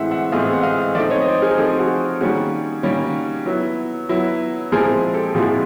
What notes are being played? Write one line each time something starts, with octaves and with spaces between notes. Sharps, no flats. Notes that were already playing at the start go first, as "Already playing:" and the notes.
Already playing: A2 E3 G#3 C4 E5 F#5
E5 F#5
A2 E3 G#3 C4 D#5 F5
F#5
D#5 F5
F3 A3 C4 D#4 D5 E5
C#5 D#5
D#5
C5 D5
G#4 A#4
F3 A3 C4 D#4 G4 A4
F#4 G#4
D#3 G3 A#3 C#4 F#4 G#4
D#3 G3 A#3 C#4
F#3 B3 E4
F#3 B3 E4
A#2 F3 G#3 C4 E4 G#4 A#4
G4 A4
A#2 F3 G#3 C4 E4 F#4 G#4